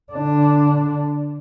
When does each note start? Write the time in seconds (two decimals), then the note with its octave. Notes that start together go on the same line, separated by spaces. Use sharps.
0.13 D3 D4